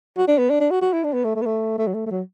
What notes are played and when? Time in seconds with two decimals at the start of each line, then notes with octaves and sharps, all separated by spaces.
0.17 F#4
0.28 D4
0.38 B3
0.50 D4
0.60 D4
0.70 F#4
0.82 F#4
0.93 E4
1.04 D4
1.13 B3
1.24 A3
1.36 A3
1.42 B3
1.46 A3
1.78 A3
1.87 F#3
1.94 A3
2.06 A3
2.10 F#3